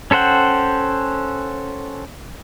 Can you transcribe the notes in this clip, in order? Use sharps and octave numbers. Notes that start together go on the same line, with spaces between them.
C#4 A4 C5 F#5 G5